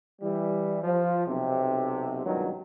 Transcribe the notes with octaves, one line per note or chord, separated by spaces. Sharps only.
E3 G3
F3
B1 C3
C#2 G2 B2 D#3 F#3